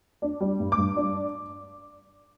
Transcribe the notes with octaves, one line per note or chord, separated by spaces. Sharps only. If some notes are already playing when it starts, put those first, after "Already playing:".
D4
G3
G2
D6
G2
D4